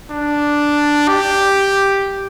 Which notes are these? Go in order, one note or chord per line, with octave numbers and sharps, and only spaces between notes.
D4
G4